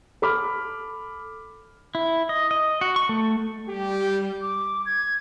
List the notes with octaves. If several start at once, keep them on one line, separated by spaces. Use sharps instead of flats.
A4 B5 D6 F6
E4
D#5
D#5
F#4
C#6
A3
G3 G4
D6
G#6